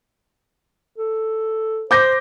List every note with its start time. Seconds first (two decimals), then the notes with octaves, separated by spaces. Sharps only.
0.98 A4
1.91 C5 D6 G6 A#6